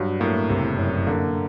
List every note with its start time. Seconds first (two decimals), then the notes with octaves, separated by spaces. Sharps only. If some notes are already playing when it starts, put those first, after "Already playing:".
Already playing: G2 F#3
0.20 A2 A#3
0.49 F#1 C3
0.78 F#2
1.07 D3 A#3